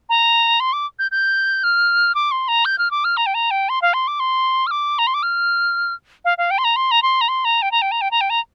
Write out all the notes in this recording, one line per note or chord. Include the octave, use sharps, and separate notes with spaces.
A#5
C6
D6
G6
G6
F6
D6
C6
A#5
G6
F6
D6
F6
A#5
G5
A#5
G5
C6
F5
C6
D6
C6
F6
D6
A#5
C6
D6
F6
F5
F5
G5
C6
A#5
C6
A#5
C6
A#5
C6
A#5
G5
A#5
G5
A#5
G5
A#5
G5
A#5